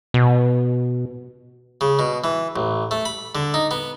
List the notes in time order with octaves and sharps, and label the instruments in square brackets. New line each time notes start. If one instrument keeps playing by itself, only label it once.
[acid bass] B2
[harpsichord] C#3
B2
E3
A1
A3
B5
D3
D#4
B3